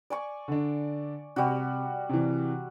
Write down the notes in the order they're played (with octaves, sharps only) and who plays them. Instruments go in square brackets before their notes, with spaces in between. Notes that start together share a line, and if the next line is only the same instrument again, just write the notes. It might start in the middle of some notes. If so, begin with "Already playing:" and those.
[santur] D5 G#5 C#6
[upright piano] D3 D4
[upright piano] C3 [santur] G3 F#4
[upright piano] C3 E3